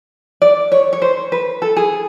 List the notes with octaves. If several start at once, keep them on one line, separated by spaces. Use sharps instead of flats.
D5
C#5
C#5
C5
B4
A4
G#4